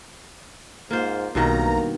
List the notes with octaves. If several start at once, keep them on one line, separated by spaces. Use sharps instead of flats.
G#2 A#3 F4 C5
B1 G2 B2 D#3 A#3 A#5